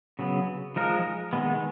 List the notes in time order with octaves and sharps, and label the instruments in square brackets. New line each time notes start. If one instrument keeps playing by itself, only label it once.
[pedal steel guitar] C#3 F#3 B3
F3 G#3 D#4 A#4
D#3 G#3 B3